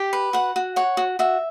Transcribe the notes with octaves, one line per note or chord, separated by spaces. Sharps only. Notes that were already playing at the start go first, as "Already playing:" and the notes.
Already playing: G4 G5
B4
F#4 F#5
F#4
C#5 F#5
F#4
F#4 E5